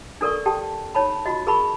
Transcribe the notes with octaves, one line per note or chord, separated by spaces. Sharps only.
D4 A4 A#4 D5 C#6
G4 A4 G5 A5
D#4 C#5 A5 B5
F4 F#4 D#5
G#4 A#4 A5 B5 C#6